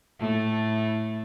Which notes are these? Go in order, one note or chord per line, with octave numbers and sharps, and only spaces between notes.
A2 A3